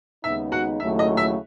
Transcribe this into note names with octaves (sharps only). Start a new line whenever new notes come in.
D#2 C#3 G#3 B3 D#4 E5
F#4 F#5
D#2 C#3 F#3 A3 E4 E5
D#5
E5